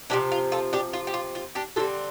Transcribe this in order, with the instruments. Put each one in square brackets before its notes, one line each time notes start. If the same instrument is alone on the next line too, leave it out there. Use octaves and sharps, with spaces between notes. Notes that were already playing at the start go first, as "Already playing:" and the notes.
[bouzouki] C3 F3 A3 C4 D4 G4
F4
F4 A4
D4 G4
F4
G4
F4
F4
D4 G4
D3 G3 C4 F4 A4